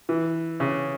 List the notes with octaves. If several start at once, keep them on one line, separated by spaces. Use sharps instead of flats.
E3
C#3